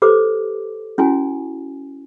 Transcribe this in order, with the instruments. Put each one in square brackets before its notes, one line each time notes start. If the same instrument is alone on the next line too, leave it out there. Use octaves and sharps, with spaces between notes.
[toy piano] G4 A4 B4 C5 D6
C#4 E4 F#4 G#5